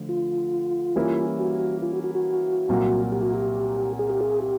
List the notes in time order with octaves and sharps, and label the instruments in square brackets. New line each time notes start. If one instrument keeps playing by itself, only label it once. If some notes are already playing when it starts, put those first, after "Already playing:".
Already playing: [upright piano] D3 F3 A3
[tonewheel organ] F4
[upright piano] E3 G3 A#3 C#4 E4
[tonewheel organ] F#4
F4
F#4
F#4
F#4
[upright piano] C2 A#2 F#3 A#3
[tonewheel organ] G4
F#4
G4
G#4
G4
G#4
G4